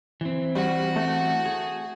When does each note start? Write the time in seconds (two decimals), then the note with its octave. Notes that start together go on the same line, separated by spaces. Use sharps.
0.21 E3 C4
0.55 G3 F#4
0.96 A3
1.46 G#4